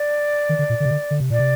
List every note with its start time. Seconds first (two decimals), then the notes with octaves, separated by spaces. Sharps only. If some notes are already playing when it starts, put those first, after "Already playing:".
Already playing: D5
0.49 D#3
0.59 D3
0.69 A#2
0.80 D3
0.85 C3
0.91 D3
1.11 D3
1.20 C3
1.30 A#2 D5
1.39 C3